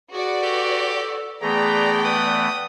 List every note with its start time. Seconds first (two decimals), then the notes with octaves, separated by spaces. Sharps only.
0.12 F#4 G#4 B4 D5
0.43 G4 A4
1.42 E3 A3 B3 G#4 D5 G5 A#5
2.05 B4 D#6